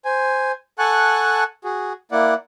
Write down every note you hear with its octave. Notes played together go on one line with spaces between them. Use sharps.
C5 G#5
A4 F#5 G#5 A5 C#6 F#6
F#4 G#4
A#3 E4 D5 F#5